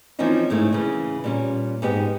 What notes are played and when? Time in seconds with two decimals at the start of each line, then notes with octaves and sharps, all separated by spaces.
0.19 E3 F3 A#3 C4 C#4 D#4
0.50 G#2 C#3 A3 A#3 E4
0.73 C#3 E3
1.24 A#2 G3 C#4
1.82 G#2 B3 D#4 G4